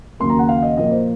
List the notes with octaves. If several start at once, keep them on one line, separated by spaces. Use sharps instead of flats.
D#2 C#3 F#3 A#3 C6
A#5
F#5
F5
D#5
A#2 F3 A#3 D#5
C5